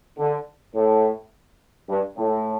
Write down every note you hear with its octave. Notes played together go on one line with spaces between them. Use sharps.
D3
A2
G2
A2